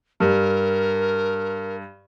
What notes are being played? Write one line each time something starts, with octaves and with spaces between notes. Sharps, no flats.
G2 A#4